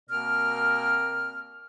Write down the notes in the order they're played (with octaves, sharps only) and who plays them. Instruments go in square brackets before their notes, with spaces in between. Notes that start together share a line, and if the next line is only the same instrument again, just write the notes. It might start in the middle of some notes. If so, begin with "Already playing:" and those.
[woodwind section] B2 A#3 C4 A#4 D5 F6